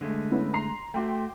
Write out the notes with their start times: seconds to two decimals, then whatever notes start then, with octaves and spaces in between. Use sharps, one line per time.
0.01 D3 G#3 A3
0.31 B3 C#4 E4
0.54 A#5 C6 C7
0.94 A3 F#4 G5 C6 D6